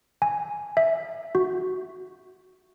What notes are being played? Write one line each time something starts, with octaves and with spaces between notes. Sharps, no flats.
G#5
E5
F#4